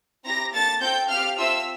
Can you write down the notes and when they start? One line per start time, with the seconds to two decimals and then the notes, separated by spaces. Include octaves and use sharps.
0.25 C4 E4 G4 A#5 A#6
0.53 A#3 D4 A4 A5 A6
0.81 C4 F4 A4 G5 G6
1.09 C4 G4 F5 F6
1.38 C4 F4 A4 E5 E6